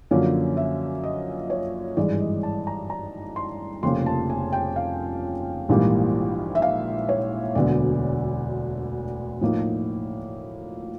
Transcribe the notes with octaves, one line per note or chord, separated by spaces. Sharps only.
F#2 D3 F3 A#3 C#4
E5
D#5
C#5
G#1 G2 E3 G#3 D5
D#5
A5
A#5
A#5
C6
F1 F2 C#3 F3 A#3 C6
A5
G#5
G5
F5
A#1 G#2 E3 G3 A#3
E5
F5
C#5
E1 D2 D3 F#3 B3 D5
A2 F3 A#3 D#4